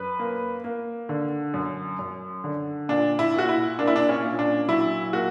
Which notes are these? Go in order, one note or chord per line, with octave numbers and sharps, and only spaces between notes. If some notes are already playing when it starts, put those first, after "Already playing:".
Already playing: F#2 B4
A#3
A#3
D3
F#2
F#2
D3
A#2 D4
E4
A#2 F#4
E4
A#3 D4
E4
D4
C#4
A#2
D4
F#3 E4
A#3 F#4